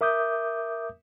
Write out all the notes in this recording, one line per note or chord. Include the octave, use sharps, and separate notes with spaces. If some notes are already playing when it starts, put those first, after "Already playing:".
A#4 E5 D6 D#6 G6